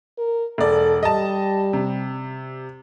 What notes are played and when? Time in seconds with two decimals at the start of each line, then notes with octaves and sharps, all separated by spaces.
0.18 A#4
0.58 E1 A4 D5
1.03 G3 D#5 A5
1.73 C3